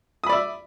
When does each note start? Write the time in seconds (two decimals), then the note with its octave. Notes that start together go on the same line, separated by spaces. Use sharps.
0.24 D#6
0.27 B5
0.30 D5
0.33 E5